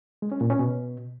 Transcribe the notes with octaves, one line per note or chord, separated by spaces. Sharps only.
G#3
C#4
A#2
C#4
B2